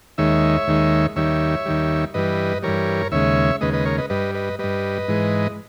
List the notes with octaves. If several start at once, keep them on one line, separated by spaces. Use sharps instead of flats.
D#2 D#3 G#3 C#5 E5
D#2 D#3 G#3
D#2 D#3 G3 C#5 E5
D#2 D#3 G3
G2 E3 G3 B4 D#5
G2 E3 G3 A#4 C#5
D#2 C#3 G#3 C#5 E5
D#2 C#3 G#3 B4 D#5
B4 D#5
A#4 C#5
B4 D#5
G2 G3 B4 D#5
B4 D#5
G2 G3 B4 D#5
G#2 E3 G#3